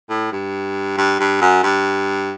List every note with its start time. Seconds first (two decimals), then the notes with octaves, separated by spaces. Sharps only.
0.10 A2
0.32 G2
0.98 G2
1.20 G2
1.41 F#2
1.63 G2